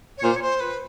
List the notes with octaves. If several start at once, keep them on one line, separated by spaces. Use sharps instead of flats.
C#5
A#2 C5
C#5
C5
B4